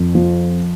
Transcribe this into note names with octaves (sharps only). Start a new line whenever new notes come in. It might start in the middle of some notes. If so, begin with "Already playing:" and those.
Already playing: F2
F3